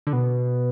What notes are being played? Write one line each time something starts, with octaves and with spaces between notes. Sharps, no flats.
D3
B2